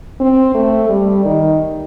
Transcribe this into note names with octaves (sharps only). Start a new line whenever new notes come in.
C4
A3
G3
D#3